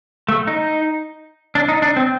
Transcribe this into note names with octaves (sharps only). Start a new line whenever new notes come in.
A3
D#4
D4
D#4
D4
C4